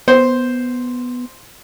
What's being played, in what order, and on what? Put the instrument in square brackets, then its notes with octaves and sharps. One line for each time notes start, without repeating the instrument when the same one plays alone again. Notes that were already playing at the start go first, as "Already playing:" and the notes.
[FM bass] B3 [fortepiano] C5